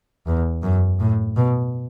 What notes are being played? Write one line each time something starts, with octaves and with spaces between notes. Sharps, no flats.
E2
F#2
A2
B2